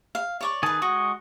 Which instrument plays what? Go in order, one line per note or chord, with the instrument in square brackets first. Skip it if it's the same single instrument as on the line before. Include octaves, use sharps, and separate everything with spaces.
[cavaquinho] F5
C#5 D5 C#6
[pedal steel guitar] D#3 G#4 [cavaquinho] B4 A5
[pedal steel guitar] G#3 C#6 D#6 [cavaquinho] F#4